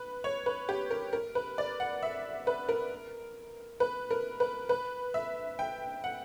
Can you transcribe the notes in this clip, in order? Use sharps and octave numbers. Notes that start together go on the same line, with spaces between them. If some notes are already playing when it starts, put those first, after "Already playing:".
Already playing: B4
C#5
B4
G4
A#4
A#4
B4
D5
F#5
E5
B4
A#4
B4
A#4
B4
B4
E5
G5
F#5